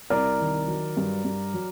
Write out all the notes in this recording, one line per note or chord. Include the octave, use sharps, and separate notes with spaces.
C2 A#4 D5
D#3
F#3
G2
G2
F#3